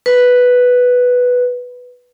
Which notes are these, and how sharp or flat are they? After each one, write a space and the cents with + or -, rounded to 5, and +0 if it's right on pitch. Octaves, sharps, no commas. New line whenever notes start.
B4 +0